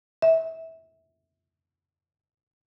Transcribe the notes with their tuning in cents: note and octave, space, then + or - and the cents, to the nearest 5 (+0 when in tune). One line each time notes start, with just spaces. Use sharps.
E5 -25